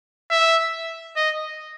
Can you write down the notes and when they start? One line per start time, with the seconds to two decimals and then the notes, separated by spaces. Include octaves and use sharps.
0.30 E5
1.16 D#5